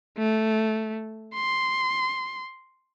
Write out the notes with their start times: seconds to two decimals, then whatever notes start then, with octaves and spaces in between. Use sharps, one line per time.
0.18 A3
1.34 C6